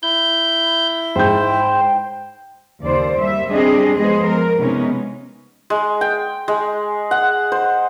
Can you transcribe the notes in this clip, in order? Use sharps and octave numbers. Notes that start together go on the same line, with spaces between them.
E4 G6
G#2 C5 G5 G6
D#2 C#3 C5 D5
G3 E5
G3 C4 D4 G4 G#4 D#5
F3 G#3 B3 G#4 C5 D#5
A#4
C3 G#3 B3 C#4 D#4
G#3
G5
G#3
F#5
C5